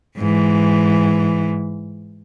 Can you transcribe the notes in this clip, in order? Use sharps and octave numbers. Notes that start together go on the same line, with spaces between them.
G#2 E3